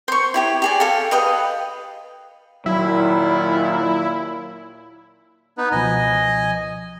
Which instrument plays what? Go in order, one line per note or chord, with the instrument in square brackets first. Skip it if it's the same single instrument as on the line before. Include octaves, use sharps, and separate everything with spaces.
[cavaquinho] C5 C#6
E4 G4 C#5
G4 G#4 D5
A4 F5
G4 B4 D#5 F5
[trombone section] D#2 A#2 [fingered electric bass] F#3 [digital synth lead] E4
[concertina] B3 D#4 B4
[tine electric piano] C#2 B2 F3 [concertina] D#5 G#5